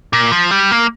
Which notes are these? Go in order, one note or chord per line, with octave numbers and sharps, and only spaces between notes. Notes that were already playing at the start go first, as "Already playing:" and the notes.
A#2
F3
G3
A#3